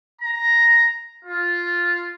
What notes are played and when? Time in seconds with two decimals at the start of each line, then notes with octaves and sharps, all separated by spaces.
0.22 A#5
1.25 F4